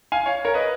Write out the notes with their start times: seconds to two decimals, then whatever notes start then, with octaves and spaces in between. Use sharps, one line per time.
0.12 F5 G#5
0.26 C#5 F5
0.45 A#4 C#5
0.54 B4 D#5